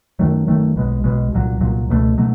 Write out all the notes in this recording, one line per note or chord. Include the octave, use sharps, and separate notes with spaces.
F#2 D#3 F#3 A3
F#2 D#3 F#3 A3
B1 B2 G#3
B1 B2 G#3
C2 A#2 F#3
C2 A#2 F#3
C#2 B2 F#3 A3
B2 F#3 A3